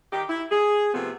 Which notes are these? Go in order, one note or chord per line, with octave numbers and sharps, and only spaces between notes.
D#3 D#4 G4
E4
G#4
C3 F3 A3 B3 C4